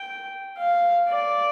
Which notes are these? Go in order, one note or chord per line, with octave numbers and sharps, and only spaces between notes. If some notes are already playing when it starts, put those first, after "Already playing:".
Already playing: G5
F5
D5